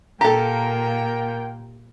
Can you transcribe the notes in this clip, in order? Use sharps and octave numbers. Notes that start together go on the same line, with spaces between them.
A#2 A#3 G4 A4 A#4 G5 A#5